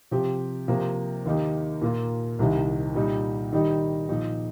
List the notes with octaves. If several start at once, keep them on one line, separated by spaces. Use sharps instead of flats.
C3 F3 C4 G4
C3 F3 A#3
D#2 D#3 A#3 D#4 G4
A#2 A#3 F4
C2 C3 D#3
A#2 G3 D#4
D#3 G3 D#4 G4
A#2 F3 D#4